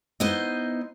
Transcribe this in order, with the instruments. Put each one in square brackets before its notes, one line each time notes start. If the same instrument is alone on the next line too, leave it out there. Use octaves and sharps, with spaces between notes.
[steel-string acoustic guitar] B3 D#4 E4 C5 D#5